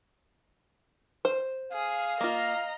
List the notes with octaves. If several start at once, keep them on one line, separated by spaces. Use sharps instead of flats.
C5
G#4 F5 D#6
A#3 F4 D#5 A#5